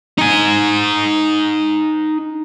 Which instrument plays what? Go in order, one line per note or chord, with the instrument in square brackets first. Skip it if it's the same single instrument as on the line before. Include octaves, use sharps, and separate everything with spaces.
[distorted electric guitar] D#4 G#5